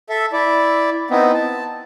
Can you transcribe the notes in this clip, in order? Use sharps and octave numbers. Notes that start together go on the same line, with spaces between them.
A4 E5
E4 D5
B3 C4 D#4 E4
A5